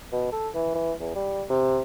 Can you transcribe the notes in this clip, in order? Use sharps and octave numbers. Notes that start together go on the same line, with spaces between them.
B2
A4
E3
E3
E2
G3
C3